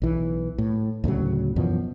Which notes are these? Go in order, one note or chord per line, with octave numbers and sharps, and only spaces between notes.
B1 E3
A2
D2 A2 C#3 F#3
F#2 B2 E3 F3